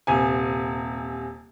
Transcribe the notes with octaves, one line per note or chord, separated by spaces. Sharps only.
D#1 C3 G#5